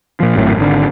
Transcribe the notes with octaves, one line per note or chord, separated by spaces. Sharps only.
A#2 F3
G#1 F#2 A2
G#1 D3